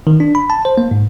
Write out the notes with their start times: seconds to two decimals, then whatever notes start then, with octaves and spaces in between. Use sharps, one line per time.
0.07 D#3
0.20 D4
0.35 B5
0.50 A5
0.65 C5
0.78 A#3
0.91 G#2